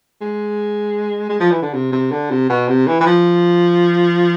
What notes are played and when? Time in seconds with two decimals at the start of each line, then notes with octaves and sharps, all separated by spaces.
0.21 G#3
1.29 G#3
1.40 F3
1.51 E3
1.62 D3
1.74 C3
1.92 C3
2.12 D3
2.31 C3
2.49 B2
2.68 C3
2.87 E3
3.01 E3
3.06 F3